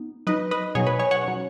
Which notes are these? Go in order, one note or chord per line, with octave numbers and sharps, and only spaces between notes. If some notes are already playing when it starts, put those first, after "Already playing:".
Already playing: B3 D#4
F#3 D#4 B4 D#5
B4 D#5
B2 F#3 D#4 G#4 C#5
B4
G#4 C#5
C#5 F#5
F#3 C#4